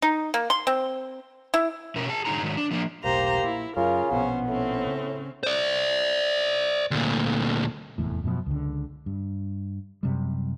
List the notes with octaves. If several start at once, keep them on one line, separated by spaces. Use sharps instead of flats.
D#4
A#3
C6
C4
E4
B2 C#4 A#4
G#4 A5
G#2 D3 F#3 D#4 G#4 A#5
G#2 D#3 F#3
D4
F3 A#3 D4
E1 B1 A2 A#3 G4 C5 A#5
A#2 E4
F#2 C#3 F4 A#4
A#1 B2 B3 C#4 C5
A2 C4 C#4
C#3
C5 D5
D2 A#2
F1 E2 A2
F#2 B2 D3 F3
C#2 D3
G2
F#2 C3 G3